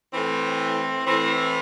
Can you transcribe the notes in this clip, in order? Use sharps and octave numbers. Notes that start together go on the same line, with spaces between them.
A2 E3 C4
A2 E3 C4